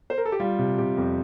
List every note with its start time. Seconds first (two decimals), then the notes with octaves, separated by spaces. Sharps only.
0.10 C5
0.18 A#4
0.25 A4
0.32 G4
0.40 G3 F4
0.59 C3
0.78 C3 G4
0.97 F2